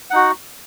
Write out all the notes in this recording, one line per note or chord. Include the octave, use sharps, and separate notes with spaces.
D#4 F#4 F#5